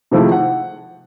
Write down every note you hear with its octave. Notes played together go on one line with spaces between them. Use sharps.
C3 D#3 F3 G#3 A3 E4
F#5